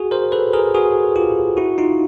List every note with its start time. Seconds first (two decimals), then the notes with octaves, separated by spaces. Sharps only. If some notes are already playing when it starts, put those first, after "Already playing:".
Already playing: F#4 G#4
0.11 A#4 C5
0.32 A4 B4
0.53 G#4 A#4
0.74 F#4 G#4
1.16 F4 G4
1.57 E4 F#4
1.78 D#4 F4